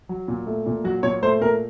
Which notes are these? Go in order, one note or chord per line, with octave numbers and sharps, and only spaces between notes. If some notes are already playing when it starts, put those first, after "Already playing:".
F#3
A#2
A3
A#2
F#3 F#4
A#2 C#5
A3 C5
A#2 A#4